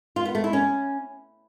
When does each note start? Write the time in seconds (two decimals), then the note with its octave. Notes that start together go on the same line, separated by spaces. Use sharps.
0.16 F4
0.25 B3
0.35 A3
0.44 E4
0.53 C#4